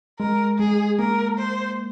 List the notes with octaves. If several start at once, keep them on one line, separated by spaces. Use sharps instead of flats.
G#3 A#4
G#3 G#4
A#3 A#4
C5